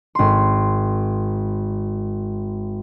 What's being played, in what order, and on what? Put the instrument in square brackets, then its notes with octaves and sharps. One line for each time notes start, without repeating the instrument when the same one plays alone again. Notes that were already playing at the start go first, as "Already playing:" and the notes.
[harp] G#1 C6